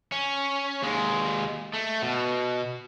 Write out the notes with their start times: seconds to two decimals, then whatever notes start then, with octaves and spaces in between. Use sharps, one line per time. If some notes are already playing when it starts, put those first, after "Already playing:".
0.12 C#4
0.82 D#2 G#3
1.74 A3
2.03 B2